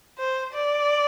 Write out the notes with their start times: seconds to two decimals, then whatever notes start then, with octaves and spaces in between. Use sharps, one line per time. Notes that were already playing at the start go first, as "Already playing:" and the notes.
0.18 C5
0.53 D5